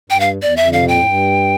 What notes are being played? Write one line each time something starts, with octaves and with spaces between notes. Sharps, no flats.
G2 G5
F5
E2 D5
F2 E5
D3
C3 F5
A#2 G5
A2
G2